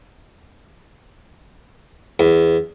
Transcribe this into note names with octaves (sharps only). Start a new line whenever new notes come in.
E2